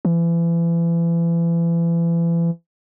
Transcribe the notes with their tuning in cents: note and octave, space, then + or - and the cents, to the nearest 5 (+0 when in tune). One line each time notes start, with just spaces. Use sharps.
E3 +35